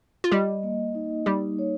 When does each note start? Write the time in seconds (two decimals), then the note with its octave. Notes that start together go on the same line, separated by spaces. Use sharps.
0.24 F4
0.31 G3 G4 D#5
0.63 A#3
0.95 D#4
1.26 G3 D#4 G4
1.59 C#5